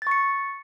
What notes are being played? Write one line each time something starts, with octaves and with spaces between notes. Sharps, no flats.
C#6 A6 C#7